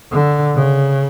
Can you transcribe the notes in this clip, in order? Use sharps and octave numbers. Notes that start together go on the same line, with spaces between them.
D3
C#3